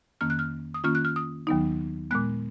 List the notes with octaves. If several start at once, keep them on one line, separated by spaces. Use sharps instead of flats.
F2 D#3 A#3 C#4 F6
F#6
F6
D#6
D#3 A#3 C#4 F4 F6
F#6
F6
D#6
D#2 D#3 F#3 B3 D#4
A#2 G#3 B3 F#6